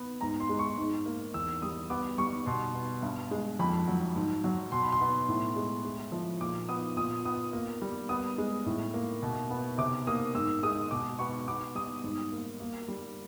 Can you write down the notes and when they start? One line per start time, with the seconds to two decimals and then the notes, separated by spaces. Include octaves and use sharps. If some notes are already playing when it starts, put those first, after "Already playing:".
Already playing: B3
0.21 G#2 A#5
0.40 C6
0.49 G#3
0.59 C#6
0.78 G#2
1.06 A#3
1.34 E2 E6
1.62 G3 D#6
1.90 B3 D6
2.18 G3 C#6
2.46 B2 C6
2.75 B3
3.02 G2
3.31 G#3
3.59 F2 B5
3.88 F#3
4.16 G#2
4.44 F#3
4.72 B2 C6
4.82 B5
4.92 C6
5.01 B3
5.28 A2
5.56 G#3
5.85 G#3
6.12 F3
6.41 A#2 D6
6.69 B3 D#6
6.97 A#2 D#6
7.25 B3 D#6
7.53 A#3
7.82 G3
8.09 B3 D#6
8.38 G#3
8.66 A2
8.94 A#3
9.23 B2
9.50 B3
9.78 C3 D6
10.07 A#3 D#6
10.34 G#2 E6
10.63 G#3 D#6
10.91 B2 D6
11.19 B3 C#6
11.48 B3 D6
11.75 G3 D#6
12.04 G#2
12.32 A#3
12.60 A#3
12.88 G3